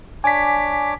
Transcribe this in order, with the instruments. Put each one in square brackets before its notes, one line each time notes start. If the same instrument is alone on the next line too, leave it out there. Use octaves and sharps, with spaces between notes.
[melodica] D4 C#5 D6 [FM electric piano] G#5 B6